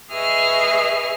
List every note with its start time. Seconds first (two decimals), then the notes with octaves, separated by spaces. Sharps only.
0.10 G#4 B4 D#5 E5 C#6 F6